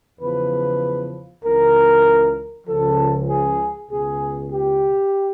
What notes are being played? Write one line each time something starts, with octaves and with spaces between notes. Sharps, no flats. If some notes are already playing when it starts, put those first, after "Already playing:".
E2 C#3 F3 B4
C#2 C#3 E3 A#4
C#2 C#3 F3 A4
G#4
C#2 B2 G#4
G4